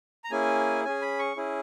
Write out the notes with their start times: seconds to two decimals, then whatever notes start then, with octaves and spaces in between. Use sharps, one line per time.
0.24 A#5
0.31 A#3 C#4 E4 G#4 G#5
0.84 C#4 G#4 G#5
1.02 B5
1.19 C#6
1.37 C#4 E4 G#4